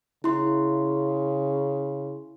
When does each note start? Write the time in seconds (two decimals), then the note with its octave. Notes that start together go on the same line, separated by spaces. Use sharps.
0.24 C#3 E4 C6